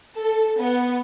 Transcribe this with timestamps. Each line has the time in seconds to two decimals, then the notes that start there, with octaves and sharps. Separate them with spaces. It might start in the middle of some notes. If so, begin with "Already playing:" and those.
0.18 A4
0.61 B3